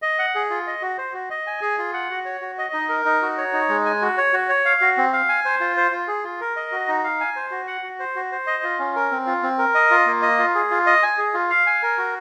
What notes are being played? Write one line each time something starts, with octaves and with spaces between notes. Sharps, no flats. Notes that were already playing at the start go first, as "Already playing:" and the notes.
D#5
F#5
G#4
F4
D#5
F#4
C5
F#4
D#5
G#5
G#4
F4
F#5
F#4
C#5
F#4
D#5
D#4
A#4
D#4
F#4
C#5
D#4
G#3
G#5
F#4
C#5
F#4
C#5
F5
F#4
C4
F5
G#5
C5
F4
C5
F4
G#4
F4
A#4
D#5
F#4
D#4
F5
G#5
C5
F#4
F#5
F#4
C5
F#4
C5
D#5
F4
C#4
A#4
C4
F4
C4
A#4
D#5
F4
A#3
D#5
F4
G#4
F4
D#5
G#5
G#4
F4
F5
G#5
A#4
F#4